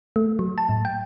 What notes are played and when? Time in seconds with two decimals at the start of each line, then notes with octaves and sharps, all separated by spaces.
0.16 A3
0.39 F#3
0.58 A5
0.69 A2
0.85 G5